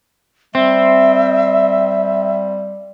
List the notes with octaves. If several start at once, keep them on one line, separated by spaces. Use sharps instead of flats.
G3 C4 E5